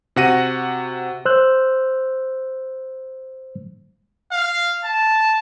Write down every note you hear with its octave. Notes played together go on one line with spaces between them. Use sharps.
C3 F#4 F#5 A#6 D#7
C5 E6 F#6 G6
F5
A5